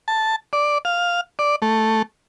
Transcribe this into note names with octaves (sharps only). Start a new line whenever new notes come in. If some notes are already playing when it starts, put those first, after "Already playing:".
A5
D5
F5
D5
A3